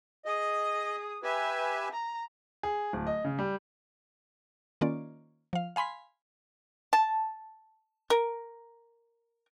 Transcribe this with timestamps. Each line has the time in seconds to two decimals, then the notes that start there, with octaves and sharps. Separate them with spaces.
0.25 G#4 D#5 D#6
1.23 G4 B4 E5 G#5
1.93 A#5
2.63 G#4
2.93 D1
3.07 D#5
3.24 C#3
3.39 G3
4.81 D#3 A#3 C#4 F4 D5
5.53 F3 F5
5.76 F5 G#5 B5 C6 B6
6.93 A5
8.10 A#4